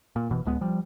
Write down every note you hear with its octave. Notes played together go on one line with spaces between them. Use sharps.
A#2
F#1 B2 E3
D1 C#2 G#3 B3
F3 G3